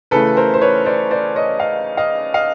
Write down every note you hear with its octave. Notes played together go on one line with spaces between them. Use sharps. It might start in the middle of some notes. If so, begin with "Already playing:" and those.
C#3 E3 A3 A4 B4
A#4 C5
C5
B4 C#5
C5 D5
C5 D5
C#5 D#5
D#5 F5
D#5 F5
D#5 F5